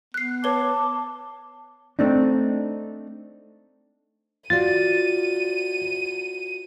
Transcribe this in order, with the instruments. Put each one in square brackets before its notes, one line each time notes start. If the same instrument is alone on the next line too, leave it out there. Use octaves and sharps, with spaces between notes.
[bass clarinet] B3 [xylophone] F#6 C7
[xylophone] B4 C#5 G7 [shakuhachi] A5 [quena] D6
[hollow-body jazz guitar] A3 C4 D4 D#4
[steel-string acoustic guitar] F4 F#4 D5 [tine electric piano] A6 [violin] D#7